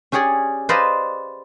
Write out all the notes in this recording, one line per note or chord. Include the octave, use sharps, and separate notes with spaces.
C#4 G4 G#4 C#5 D5
B4 C5 D5 D#5 F5 A#5